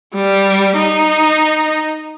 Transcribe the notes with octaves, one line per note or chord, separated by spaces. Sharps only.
G3
D#4